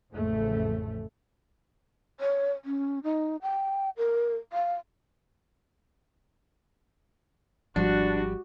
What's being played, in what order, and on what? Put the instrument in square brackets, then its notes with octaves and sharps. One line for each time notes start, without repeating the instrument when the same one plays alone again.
[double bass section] A1 F2 C#3 A3
[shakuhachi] C#5
C#4
D#4
G5
A#4
F5
[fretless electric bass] G#1 F3 [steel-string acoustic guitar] G3 [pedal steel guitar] D4 [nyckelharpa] F#4